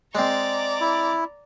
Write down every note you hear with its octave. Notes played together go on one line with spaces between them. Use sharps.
G#3 C4 D5 A#5
E4